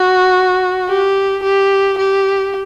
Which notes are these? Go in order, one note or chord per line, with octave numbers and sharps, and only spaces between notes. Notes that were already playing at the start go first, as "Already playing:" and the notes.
Already playing: F#4
G4
G4
G4